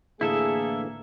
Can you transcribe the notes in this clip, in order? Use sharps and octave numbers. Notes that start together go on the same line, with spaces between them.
A2 D3 E3 A#3 E4 G#4 A4 E5